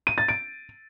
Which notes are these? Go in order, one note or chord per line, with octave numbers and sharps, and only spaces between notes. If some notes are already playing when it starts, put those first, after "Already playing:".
D#7
A6
D7